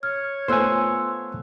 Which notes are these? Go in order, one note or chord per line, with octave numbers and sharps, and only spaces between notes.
C#5 F6
A3 B3 F4 C5 G#5 C6 E6 F#6